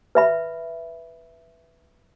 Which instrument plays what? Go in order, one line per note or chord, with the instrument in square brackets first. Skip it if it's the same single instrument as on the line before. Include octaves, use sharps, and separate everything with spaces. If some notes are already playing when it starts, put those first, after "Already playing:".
[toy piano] B4 E5 B5